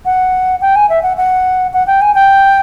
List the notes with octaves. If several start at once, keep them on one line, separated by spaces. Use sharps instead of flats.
F#5
G5
G#5
E5
F#5
F#5
F#5
G5
G#5
G5